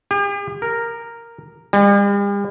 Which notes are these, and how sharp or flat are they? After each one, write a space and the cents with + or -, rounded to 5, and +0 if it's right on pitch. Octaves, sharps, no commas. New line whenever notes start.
G4 +45
A#4 -5
G3 +45